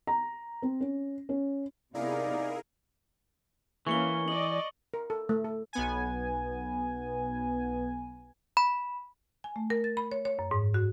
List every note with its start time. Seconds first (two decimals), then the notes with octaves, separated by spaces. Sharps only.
0.07 A#5
0.62 C4
0.81 C#4
1.29 C#4
1.95 C3 B3 D#4 E4 G#4 A#4 D5 F5
3.87 E3 A#3 C#4 C#6 C#7 G7
4.28 D5 D#5 F#7
4.94 A#4
5.10 A4
5.29 A3
5.44 A4
5.73 B1 B3 G#5
8.57 B5
9.44 G#5
9.56 A3
9.70 A#4
9.84 A6
9.97 B5
10.12 C#5
10.25 C#5
10.39 F#2
10.51 G#2
10.74 F#4